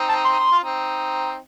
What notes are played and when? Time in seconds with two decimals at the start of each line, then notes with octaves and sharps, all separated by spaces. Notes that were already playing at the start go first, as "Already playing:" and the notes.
Already playing: C4 D#4
0.09 A5
0.24 C6
0.40 D#4
0.52 F4
0.63 C4 D#4